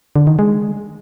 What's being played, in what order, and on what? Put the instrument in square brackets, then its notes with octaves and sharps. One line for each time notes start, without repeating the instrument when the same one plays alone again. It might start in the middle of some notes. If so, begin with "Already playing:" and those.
[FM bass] D3
D#3
G#3